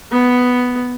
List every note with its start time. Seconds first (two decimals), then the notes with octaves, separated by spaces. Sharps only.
0.11 B3